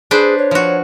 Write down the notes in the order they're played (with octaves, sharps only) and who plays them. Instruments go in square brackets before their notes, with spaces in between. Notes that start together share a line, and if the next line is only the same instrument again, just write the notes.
[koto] D4 B4 C5 [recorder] G#4
[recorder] C#5
[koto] F3 F#4